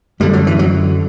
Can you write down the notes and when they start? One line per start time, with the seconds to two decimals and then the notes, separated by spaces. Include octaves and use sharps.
0.20 F#2 D3 G3
0.33 F#3
0.47 E3
0.59 F#3